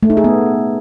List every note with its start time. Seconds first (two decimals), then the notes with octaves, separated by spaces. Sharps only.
0.03 A3
0.10 D#4
0.17 G#4
0.24 B3